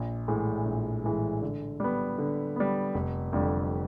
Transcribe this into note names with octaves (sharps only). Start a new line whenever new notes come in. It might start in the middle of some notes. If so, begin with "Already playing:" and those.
Already playing: A#1
A2 E3 G#3
A#1
A2 E3 G#3
D3
G3 B3
D3
G3 B3
F1
F2 D3 G3